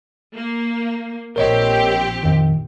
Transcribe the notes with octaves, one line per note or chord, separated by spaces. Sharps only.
A#3
A#1 C4 G4 A#4 C#5 D#5
F2 D#3